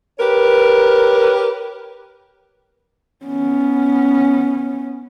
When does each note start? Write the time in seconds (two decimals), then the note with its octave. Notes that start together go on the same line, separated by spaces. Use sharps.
0.19 G4 A#4 B4 C#5
3.25 B3 C#4